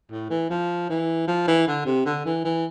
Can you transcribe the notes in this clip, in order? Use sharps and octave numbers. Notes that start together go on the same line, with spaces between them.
A2
E3
F3
E3
F3
E3
D3
C3
D3
E3
E3